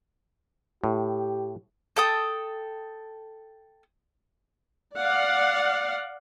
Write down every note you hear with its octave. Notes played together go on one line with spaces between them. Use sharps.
A2 G4
A4 G5 D#6
D5 F5 F#5